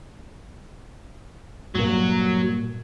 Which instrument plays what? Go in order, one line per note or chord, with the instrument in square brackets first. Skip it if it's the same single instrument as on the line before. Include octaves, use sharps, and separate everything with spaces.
[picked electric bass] G2 A#2 [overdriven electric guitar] F#3